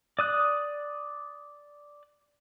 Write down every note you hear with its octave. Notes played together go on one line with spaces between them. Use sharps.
D5 D#6 F#6